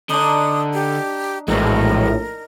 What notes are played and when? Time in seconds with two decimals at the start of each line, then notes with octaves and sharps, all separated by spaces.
0.10 D3 D4 D#4 D#6
0.74 G4
1.48 A#1 A2 E3 G#3 A#4